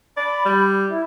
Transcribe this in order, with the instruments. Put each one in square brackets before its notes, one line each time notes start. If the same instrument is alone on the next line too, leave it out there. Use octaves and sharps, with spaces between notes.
[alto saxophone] D5 [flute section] B5
[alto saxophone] G3
[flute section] E4